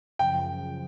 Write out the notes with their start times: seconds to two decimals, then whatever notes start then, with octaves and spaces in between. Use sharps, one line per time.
0.19 F#2 C#3 F3 G5